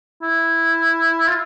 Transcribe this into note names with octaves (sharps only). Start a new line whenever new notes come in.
E4
F4